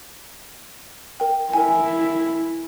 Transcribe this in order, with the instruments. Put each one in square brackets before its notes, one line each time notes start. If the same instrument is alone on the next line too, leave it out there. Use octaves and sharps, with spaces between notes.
[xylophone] A#4 G5
[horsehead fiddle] E4 [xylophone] A#4 G#5